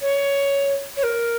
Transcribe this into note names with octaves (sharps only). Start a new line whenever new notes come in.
C#5
C#5
A#4